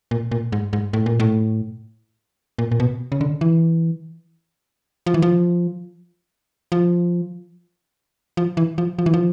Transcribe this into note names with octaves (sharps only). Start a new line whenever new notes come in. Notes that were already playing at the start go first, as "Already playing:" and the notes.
A#2
A#2
G#2
G#2
A2
A#2
A2
A#2
A#2
B2
C#3
D3
E3
F3
E3
F3
F3
F3
E3
F3
F3
E3
F3